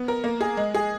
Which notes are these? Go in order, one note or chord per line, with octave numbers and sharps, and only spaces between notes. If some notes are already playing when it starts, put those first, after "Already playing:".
Already playing: B3
A#4
A#3
G#4
G#3
G#4